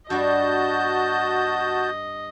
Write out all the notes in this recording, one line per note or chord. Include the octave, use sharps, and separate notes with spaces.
G2 G3 F#4 D#5 A5 G6